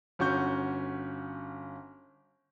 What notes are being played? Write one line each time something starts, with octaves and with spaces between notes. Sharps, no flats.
G1 C#4 F#4 C#6 G6